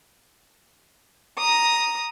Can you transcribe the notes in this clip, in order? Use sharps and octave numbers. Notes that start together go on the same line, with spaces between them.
A#5 D#6